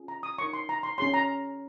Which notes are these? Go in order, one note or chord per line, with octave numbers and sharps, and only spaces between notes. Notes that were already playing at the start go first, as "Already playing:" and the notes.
Already playing: C#4 F4 G#4
A#5
D#6
D#4 A#4 C#5 C#6
C6
A#5
C6
C#4 G#4 C#5 C6
A#5